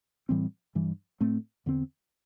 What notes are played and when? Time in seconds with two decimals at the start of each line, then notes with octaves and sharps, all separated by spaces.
0.29 A2 E3 G3 C4
0.75 G2 E3 G3
1.20 A2 A3 C4
1.66 E2 D3 C4